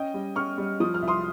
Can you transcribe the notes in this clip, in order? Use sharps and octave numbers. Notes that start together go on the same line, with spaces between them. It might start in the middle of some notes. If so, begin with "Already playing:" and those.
Already playing: C#4 D#5 G5
G3
C#4 C#6 F6
G3
F3 D#6
F6
C2
C6 D#6